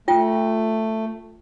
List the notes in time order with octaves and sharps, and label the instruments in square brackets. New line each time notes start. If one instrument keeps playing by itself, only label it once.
[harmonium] A3 [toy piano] F4 G5